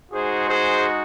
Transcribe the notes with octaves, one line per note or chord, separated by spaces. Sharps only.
G#3 D#4 F#4 G#4 C5
G#4 C5